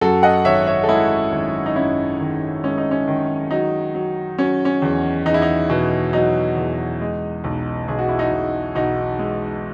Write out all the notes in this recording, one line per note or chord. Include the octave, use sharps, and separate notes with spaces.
F#2 F#4 A4
D#5 F#5
G#1 C#5 E5
C#5 E5
A4
G#3 E4 G#4
G#1
D#4
F#2 C#4 E4
D#3
G#3 C#4
D#4
C#4
D#3
F#3 D#4
F#3
F#3 C#4
C#4
E2
E2 D#4
E4
D#4
B2
F#3 D#4
E2
G#3
B1
B1 G#4
F#4
E4
D#4 F#4
B1
B1 D#4 F#4
G#3